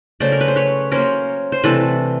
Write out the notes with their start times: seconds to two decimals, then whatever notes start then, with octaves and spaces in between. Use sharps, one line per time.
0.20 C#3 F#3 A3 C5 D5
0.32 A#4
0.41 B4
0.48 C5
0.56 B4 C#5
0.91 F#3 A#3 C#4 A#4 C5
1.52 C5
1.63 C3 E3 A3 D4 A4 B4